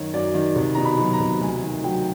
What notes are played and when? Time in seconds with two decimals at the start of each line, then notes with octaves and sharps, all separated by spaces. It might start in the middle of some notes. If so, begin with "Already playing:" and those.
Already playing: F#2 D#3 F#3 C#5
0.14 F#2 D5
0.34 D#3
0.55 C2
0.74 B2 A#5
0.84 B5
0.99 F#3
1.13 A#5
1.20 C2
1.41 D2 G#5
1.63 D#3
1.83 F#3 G5